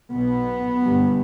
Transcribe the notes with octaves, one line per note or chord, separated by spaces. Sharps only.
B1 B2 B3
G1 G2